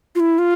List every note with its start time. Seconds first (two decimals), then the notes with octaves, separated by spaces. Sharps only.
0.15 F4
0.20 E4
0.38 F4